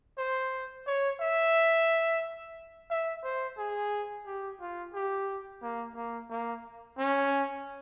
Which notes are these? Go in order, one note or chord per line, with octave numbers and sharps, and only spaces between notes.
C5
C#5
E5
E5
C5
G#4
G4
F4
G4
A#3
A#3
A#3
C#4